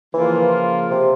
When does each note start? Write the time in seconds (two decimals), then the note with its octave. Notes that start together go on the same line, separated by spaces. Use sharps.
0.14 C#3 E3 F3 A#3 F4
0.90 C3